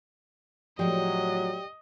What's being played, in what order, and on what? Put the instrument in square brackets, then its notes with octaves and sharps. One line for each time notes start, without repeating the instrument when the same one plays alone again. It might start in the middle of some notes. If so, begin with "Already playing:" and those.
[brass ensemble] A2 F#3 [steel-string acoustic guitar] F3 G#3 [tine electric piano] G4 D5 G5 [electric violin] D#5